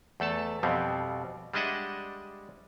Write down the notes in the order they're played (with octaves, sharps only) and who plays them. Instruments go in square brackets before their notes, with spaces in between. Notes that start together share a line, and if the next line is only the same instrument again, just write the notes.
[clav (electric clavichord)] E2 A3 A4 A5
F2 B2 G3 B3 C4
G3 G#3 D4 D#5 E5 F#5